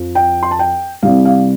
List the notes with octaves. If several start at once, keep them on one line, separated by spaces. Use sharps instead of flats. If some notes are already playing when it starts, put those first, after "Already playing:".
Already playing: F2 F3
G5
C6
A5
G5
C2 C3 G3 F5
F5